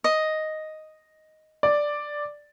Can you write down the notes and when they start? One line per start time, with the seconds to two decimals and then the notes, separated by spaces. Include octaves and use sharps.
0.04 D#5
1.63 D5